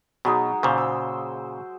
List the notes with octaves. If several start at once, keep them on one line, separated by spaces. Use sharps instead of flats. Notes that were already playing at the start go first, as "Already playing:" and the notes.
B2 F#3 G#3 D#4
A#2 C#3 C5
E6